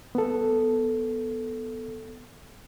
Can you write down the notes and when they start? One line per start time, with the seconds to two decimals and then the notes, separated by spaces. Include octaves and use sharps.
0.15 B3 A4